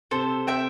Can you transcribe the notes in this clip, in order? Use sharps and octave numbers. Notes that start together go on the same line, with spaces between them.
C3 A4 C5
C4 E5 G5